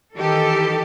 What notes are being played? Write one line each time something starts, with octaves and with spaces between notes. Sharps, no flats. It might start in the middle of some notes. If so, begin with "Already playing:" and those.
D#3 E3 G4 A4